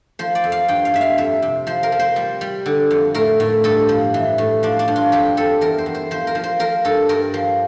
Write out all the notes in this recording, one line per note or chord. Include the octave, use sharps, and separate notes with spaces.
F3 C5
D5
F2
F5
G2 G5
F5
G2 E5
F5
F2 E5
C3
F3 C5
A#4
F3
C5
G3
G3
D3
F2
A2 A#4
A2
G2 A4
F3
E3
A2
F3 D4
D4
G2
F4
F2 G4
F2 A4
E2 A#4
C5
E2
C5
F3 C5
A#4
F3
C5
F3 A#4
G2 A4
G2 A#4
F3